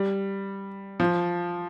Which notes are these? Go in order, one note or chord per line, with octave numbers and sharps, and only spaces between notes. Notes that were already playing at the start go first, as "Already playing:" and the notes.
Already playing: G3
F3